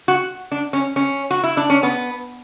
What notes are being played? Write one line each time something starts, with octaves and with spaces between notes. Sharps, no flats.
F#4
D4
C#4
C#4
F#4
E4
D4
C#4
B3